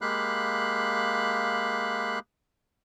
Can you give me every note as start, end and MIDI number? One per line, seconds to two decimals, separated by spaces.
0.01 2.19 56
0.01 2.19 58
0.01 2.19 67
0.01 2.19 77
0.01 2.19 83
0.01 2.19 90